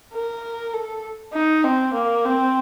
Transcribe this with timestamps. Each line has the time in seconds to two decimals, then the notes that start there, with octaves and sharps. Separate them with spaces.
0.13 A#4
0.73 A4
1.33 D#4
1.64 C4
1.93 A#3
2.25 C4